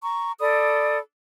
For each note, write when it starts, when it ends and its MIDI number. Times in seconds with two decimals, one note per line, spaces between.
0.03 0.33 82
0.03 0.33 85
0.40 0.98 69
0.40 0.98 74
0.40 0.98 83
0.40 0.98 87